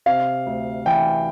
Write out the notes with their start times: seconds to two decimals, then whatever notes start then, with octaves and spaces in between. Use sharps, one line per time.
0.06 C3 F5
0.46 D2
0.86 E3 G5